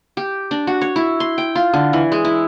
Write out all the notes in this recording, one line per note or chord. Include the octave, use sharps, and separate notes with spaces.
G4
D4
F#4
C#5
E4
C6
G5
F4
D3
E3
G#3
E4